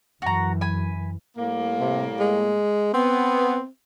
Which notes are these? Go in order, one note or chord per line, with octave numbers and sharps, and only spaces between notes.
F#2 E3 F#4 A#5
G#5 B5
A2 G3 A#3
C3
G#3
B3 C4